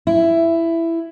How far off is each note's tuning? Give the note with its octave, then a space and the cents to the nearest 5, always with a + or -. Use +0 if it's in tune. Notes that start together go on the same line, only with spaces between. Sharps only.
E4 +10